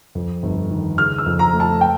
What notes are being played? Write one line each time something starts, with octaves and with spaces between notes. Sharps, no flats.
F2
G1
D#3
C#3 F6
E6
F2
A#5
A3
A5
G5